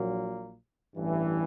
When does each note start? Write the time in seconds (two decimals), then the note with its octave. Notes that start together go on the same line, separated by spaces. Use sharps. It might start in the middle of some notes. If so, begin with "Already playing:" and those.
Already playing: A#1 A#2 F#3 A#3
0.95 A1 G2 E3